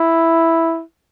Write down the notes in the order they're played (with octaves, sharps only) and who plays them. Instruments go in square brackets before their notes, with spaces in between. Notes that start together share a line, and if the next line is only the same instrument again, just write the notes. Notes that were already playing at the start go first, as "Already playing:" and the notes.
Already playing: [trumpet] E4